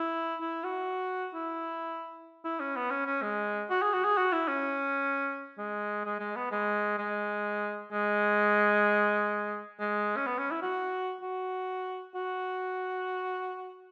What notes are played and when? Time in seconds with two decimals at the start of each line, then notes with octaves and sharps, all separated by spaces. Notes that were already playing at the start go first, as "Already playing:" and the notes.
Already playing: E4
0.41 E4
0.64 F#4
1.34 E4
2.44 E4
2.60 C#4
2.76 B3
2.91 C#4
3.06 C#4
3.22 G#3
3.70 F#4
3.82 G#4
3.93 F#4
4.04 G#4
4.17 F#4
4.32 E4
4.48 C#4
5.58 G#3
6.05 G#3
6.19 G#3
6.36 B3
6.51 G#3
6.98 G#3
7.92 G#3
9.79 G#3
10.17 C#4
10.26 B3
10.39 C#4
10.51 E4
10.62 F#4
11.21 F#4
12.15 F#4